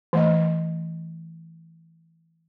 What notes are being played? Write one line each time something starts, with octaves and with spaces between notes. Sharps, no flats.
E3 A3 D#5